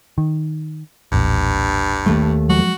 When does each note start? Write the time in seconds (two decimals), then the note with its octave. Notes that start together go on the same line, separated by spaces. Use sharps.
0.18 D#3
1.12 D#1 A1 G2 A#2
2.06 D#2 A3
2.49 F3 F#3 G#3 F#4